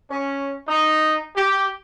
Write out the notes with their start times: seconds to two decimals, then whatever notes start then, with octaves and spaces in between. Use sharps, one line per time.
0.11 C#4
0.68 D#4
1.36 G4